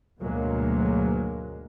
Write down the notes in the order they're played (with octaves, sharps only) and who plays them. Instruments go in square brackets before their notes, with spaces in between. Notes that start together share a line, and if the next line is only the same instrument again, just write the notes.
[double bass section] D2 G#2 B2 F#3 G#3 A#3